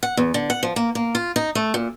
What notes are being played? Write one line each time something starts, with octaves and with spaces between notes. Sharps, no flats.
F#5
E2
D3
F#5
F3
A#3
A#3
F4
D#4
A3
A#2